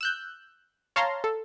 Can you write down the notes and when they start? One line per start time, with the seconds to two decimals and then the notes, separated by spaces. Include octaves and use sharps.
0.01 E6 F#6 G6
0.96 C#5 F5 A5 A#5 C6
1.24 A4